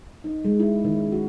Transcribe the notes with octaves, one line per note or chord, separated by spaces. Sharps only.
D#4
G#3
E4
D#3
C#4
F#4